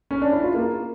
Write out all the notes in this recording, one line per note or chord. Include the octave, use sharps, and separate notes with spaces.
C#4
D4
E4
F4
A#3